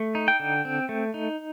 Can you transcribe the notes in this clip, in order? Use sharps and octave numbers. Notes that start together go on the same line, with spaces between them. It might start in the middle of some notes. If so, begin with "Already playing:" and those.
Already playing: A3
D#4
G5
D3
C4
A3
D#4